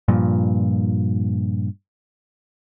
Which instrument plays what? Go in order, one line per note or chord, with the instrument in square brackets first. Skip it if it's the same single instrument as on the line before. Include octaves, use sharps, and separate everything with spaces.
[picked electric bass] G2 A#2 F3